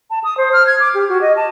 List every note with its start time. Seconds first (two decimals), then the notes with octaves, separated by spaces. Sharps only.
0.10 A5
0.24 D#6
0.37 C5
0.53 F6
0.67 G#6
0.80 D6
0.95 G4
1.09 F#4
1.22 D#5
1.37 A5